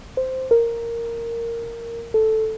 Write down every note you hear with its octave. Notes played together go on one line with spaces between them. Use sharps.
C5
A#4
A4